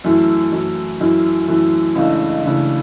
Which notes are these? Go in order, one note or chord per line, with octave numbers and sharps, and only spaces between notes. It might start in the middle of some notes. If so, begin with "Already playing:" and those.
F#2 E3 A3 E4
F#2 E3 A3 E4
F#2 E3 A3 E4
F#2 E3 A3 E4
C#2 C#3 E3 A3 D4
C#2 C#3 E3 A3 D4